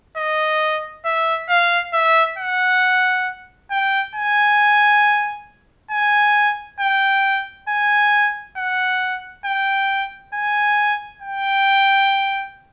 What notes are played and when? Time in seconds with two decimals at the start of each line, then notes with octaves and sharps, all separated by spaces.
0.17 D#5
1.05 E5
1.50 F5
1.94 E5
2.38 F#5
3.71 G5
4.16 G#5
5.91 G#5
6.80 G5
7.69 G#5
8.57 F#5
9.46 G5
10.34 G#5
11.22 G5